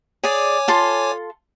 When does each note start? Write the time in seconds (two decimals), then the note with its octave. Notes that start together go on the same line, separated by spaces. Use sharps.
0.24 G#4 C#5 D5 G#5 D6
0.68 F4 A4 C6